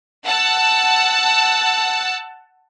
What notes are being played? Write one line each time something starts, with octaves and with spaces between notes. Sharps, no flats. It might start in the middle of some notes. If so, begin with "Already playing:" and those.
F#5 A5 E6